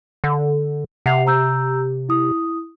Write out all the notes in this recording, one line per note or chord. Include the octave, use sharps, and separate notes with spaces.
D3
C3 F#5 C7 F7
A#5 E6 G6
E4 D#6